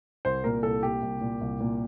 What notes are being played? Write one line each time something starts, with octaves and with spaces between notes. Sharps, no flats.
C2 C5
A#2 A#4
C2 A4
A#2 G4
C2
A#2
C2
A#2